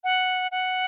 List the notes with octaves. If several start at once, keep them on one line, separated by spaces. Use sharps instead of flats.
F#5
F#5